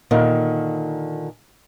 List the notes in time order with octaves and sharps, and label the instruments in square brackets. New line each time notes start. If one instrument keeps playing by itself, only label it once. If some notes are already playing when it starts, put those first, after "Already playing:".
[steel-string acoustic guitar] A#2 D3 D#3